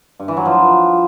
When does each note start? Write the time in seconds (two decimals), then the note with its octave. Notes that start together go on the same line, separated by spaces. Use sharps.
0.20 G2
0.28 E3
0.37 F#3
0.45 F3